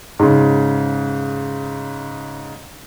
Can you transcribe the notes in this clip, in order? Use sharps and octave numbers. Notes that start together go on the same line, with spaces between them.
G#2 C#3